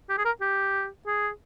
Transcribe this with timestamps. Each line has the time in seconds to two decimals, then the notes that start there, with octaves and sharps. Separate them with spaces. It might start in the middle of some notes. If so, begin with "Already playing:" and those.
0.09 G4
0.18 G#4
0.25 A#4
0.41 G4
1.07 G#4